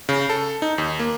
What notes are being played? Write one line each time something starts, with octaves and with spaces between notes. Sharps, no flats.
C#3
A4
D#4
D#2
A#3